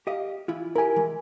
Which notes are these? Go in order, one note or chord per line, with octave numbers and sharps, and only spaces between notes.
G4 D#5 F5
E3 E4 F4
E4 G4 A#4 G#5
E3 G#3